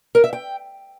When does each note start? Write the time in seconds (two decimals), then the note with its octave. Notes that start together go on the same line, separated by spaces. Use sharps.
0.15 A#4
0.24 E5
0.33 G5